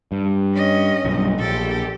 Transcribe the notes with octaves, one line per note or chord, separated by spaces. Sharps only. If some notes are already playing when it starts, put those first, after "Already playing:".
G2
C#4 D#5
B1 G2
A#1 G4 A4